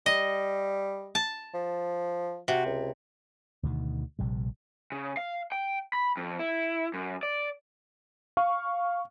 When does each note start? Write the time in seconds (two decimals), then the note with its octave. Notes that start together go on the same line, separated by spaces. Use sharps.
0.06 G3 D#5
1.15 A5
1.54 F3
2.48 C3 F#4
2.66 C#2
3.63 D2 B2 D#3
4.19 A#1 C3 G3
4.92 C#3
5.17 F5
5.52 G5
5.93 B5
6.17 F2
6.39 E4
6.94 F#2
7.23 D5
8.37 F5 C#6